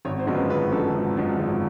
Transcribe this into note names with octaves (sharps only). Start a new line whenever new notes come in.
G#1 C#5
C5
F#2 D3 F3 G#3
B4
G#1 B4
F#2 D3 F3 G#3 A4
G#1
F#2 D3 F3 G#3
G#1